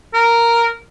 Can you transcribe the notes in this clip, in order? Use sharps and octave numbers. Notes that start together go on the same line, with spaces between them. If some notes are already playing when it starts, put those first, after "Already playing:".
A#4